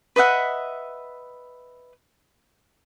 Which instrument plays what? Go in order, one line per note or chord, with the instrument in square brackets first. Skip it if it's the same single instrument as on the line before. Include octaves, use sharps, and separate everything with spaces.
[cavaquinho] B4 D#5 E5 F#5